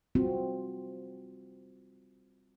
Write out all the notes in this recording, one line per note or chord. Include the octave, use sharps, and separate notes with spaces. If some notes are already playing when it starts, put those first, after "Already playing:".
G3 C4 F4 F#4